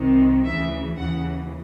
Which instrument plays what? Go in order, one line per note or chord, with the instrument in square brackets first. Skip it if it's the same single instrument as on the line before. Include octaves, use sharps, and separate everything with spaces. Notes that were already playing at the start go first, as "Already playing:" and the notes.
Already playing: [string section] C2 C3 D#3
D2 C#3 E3 E5
D#2 C#3 E3 F#5